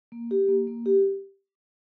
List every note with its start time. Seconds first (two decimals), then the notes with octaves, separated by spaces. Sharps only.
0.12 A#3
0.31 G4
0.49 A#3
0.67 A#3
0.86 G4